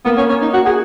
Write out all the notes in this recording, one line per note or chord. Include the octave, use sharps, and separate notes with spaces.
A#3 B3
C#4
C#4
D#4
F#4
G#4